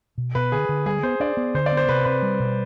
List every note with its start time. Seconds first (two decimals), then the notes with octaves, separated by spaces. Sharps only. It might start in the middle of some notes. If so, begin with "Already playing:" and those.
0.18 B2
0.35 B2 B4
0.52 D3 G#4
0.69 D3
0.86 G3 G#4
1.03 B3 C5
1.20 D4 D5
1.37 B3
1.54 D3 C5
1.66 D5
1.72 B3
1.77 C5
1.88 C3 B4
2.05 C3 B4
2.22 G3
2.40 B2